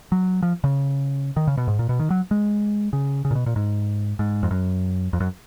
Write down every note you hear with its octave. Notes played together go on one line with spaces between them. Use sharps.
F#3
F3
C#3
D#3
C#3
B2
G#2
A#2
B2
D#3
F#3
G#3
C#3
C#3
A#2
B2
A#2
G#2
G#2
F2
F#2
F2
F#2